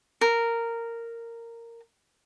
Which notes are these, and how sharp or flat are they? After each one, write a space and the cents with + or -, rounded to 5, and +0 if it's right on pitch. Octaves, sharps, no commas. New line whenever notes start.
A#4 -10